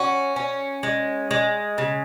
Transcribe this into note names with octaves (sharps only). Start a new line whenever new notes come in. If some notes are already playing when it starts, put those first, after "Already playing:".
Already playing: C#4 F#4
C#4
G#3
G#3
C#3